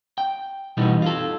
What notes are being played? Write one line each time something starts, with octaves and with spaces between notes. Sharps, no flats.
G5
B2 E3 G3 B3 D#4
F4 A4